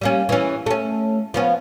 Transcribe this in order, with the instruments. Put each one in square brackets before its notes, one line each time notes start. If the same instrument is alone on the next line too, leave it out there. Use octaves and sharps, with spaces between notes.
[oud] G3 A#3 C#4
E3 C#4
A3 C#4
F3 B3 C#4